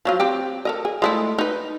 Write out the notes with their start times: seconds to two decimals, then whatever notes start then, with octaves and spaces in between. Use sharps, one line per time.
0.05 F3 F#3 F4
0.20 C4 G4
0.65 A4 A#4 D#5
0.85 G#4
1.02 G#3 A3 E4
1.38 D#4 B4